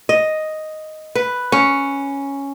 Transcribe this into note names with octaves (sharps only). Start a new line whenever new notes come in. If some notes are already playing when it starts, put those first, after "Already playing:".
D#5
B4
C#4